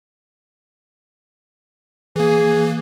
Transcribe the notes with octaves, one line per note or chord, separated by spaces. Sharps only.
E3 A#3 G#4